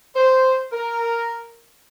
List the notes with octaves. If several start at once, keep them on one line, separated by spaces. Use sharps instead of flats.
C5
A#4